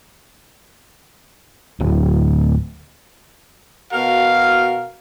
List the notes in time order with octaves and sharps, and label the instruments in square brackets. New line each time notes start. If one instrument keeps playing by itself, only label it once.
[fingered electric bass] D1
[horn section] B2 F#4 A#4 F5